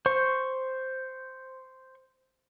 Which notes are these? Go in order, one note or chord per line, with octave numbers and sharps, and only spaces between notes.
C5 C#6